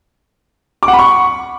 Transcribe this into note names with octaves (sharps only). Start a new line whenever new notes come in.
D6
F#5
B5
C#6